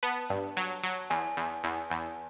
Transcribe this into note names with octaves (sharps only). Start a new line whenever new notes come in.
B3 A5
G2
F#3
F#3
E2 G#5
E2
E2
E2